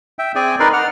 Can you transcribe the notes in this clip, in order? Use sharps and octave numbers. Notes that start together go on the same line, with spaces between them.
E5 G5
C4 G#4 D5 G5 G#5
D#4 A#4 B4 D5 C6
F#5 F6